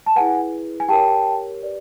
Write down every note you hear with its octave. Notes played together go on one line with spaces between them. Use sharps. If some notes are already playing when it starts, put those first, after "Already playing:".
A5
E4 G#4 B4 F#5 G#5
G#5
G4 A#4 C#5 G5 A5
G4 B4 D5